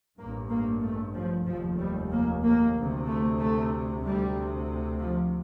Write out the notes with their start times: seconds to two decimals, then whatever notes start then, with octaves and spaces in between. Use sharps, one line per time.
0.17 A1 G2 A#3
0.50 A#3
0.82 A3
1.14 F3
1.46 F1 D#2 F3
1.78 G3
2.11 A#3
2.43 A#3
2.74 D2 C3
3.06 A3
3.39 A3
4.03 D2 C3 G3
4.99 F3